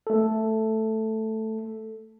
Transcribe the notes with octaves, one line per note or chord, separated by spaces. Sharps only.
A3 A4